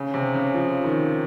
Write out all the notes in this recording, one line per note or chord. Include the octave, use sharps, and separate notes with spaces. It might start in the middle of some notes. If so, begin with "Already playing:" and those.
Already playing: C#3
C3
C#3
F3
D#3